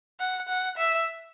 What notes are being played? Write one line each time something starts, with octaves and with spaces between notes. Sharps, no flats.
F#5
F#5
E5